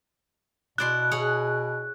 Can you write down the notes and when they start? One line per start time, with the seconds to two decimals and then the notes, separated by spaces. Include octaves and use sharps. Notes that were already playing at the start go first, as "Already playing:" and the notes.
0.78 B2 E4 D5 C6 F#6
1.11 G#4 C#5 F#5